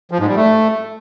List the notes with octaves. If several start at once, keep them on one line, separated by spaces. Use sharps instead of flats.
F3
G#2
G3
A3